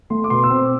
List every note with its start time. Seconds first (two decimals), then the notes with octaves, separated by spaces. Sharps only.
0.10 A3 C6
0.24 D6
0.30 B2 C6
0.44 E6
0.50 C4
0.56 D6